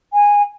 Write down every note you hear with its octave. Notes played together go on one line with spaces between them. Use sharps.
G#5